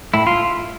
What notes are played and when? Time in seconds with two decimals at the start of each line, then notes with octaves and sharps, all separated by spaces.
0.14 A2 E4
0.27 F4